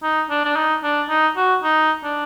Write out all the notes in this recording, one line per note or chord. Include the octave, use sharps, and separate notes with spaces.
D#4
D4
D4
D#4
D4
D#4
F#4
D#4
D4